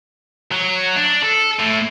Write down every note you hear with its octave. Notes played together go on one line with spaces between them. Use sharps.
F#3
D4
A4
A2